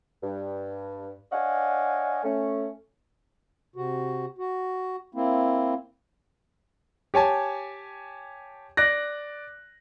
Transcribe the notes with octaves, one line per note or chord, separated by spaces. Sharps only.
G2
D4 C#5 D#5 F5 F#5 G#5
A3 C#4
C3 F#4
F#4
A#3 C4 E4
G4 C#5 G#5 A5
D5 F#6 A#6